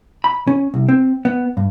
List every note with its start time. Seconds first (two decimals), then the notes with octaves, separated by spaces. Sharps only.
0.24 B5
0.47 C#4
0.74 C2
0.89 C4
1.25 B3
1.57 G2